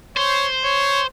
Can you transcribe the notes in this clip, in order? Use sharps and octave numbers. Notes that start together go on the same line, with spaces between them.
C5 C#5
C#5